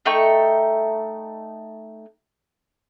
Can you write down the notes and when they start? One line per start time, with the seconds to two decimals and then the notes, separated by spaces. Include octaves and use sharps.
0.06 A3 D#4 G5 C#6